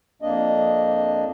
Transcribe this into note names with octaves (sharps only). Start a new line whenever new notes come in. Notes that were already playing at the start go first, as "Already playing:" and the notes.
F2 A#3 D4 D#5